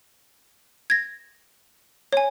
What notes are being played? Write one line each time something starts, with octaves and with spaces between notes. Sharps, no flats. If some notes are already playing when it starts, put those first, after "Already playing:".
G#6 A#6
C#5 G#5